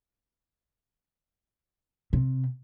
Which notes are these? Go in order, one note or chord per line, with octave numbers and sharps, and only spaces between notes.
C3